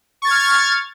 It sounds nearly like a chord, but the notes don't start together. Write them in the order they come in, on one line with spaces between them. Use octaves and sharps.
C#6 A6 G#6 F6